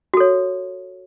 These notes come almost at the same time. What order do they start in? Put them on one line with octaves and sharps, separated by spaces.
F#4 A4 C#5